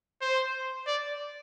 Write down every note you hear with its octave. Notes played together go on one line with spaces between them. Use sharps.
C5
D5